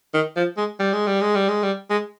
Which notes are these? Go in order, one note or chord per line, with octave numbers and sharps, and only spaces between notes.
D#3
F3
G#3
G3
G#3
G3
G#3
G3
G#3
G3
G#3